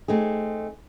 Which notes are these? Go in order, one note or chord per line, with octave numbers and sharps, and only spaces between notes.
A3 C4 D#4 G#4